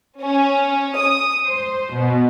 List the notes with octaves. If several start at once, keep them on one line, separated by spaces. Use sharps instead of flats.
C#4
D#6
C5
B2